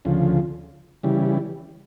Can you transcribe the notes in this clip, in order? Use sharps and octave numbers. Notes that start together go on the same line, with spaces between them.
D2 C#3 F3
C#3 E3 G3